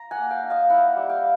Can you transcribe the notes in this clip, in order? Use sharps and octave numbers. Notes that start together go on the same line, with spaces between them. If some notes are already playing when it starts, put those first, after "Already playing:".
Already playing: A#5
F#5 G#5
A#3
F5 G5
D#4
D#5 F5
E4 E5 F#5
G3
F5 G5